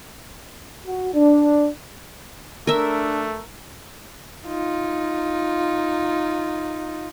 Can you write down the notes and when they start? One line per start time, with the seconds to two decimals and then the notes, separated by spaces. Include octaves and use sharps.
0.85 F#4
1.14 D4
2.67 A3 D4 A#4 E5
4.47 D#4 F4